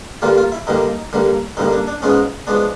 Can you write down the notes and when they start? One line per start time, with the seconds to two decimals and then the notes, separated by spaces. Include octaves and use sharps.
0.22 G2 D3 G3 A#3 F4
0.38 F4
0.52 E4
0.67 G2 D3 G3 A#3 D#4
1.13 G2 D3 G3 A#3
1.57 G2 D3 G3 A#3 D#4
1.72 D4
1.87 D4
2.02 G#2 F3 G#3 B3 C#4
2.47 F3 G#3 B3 D4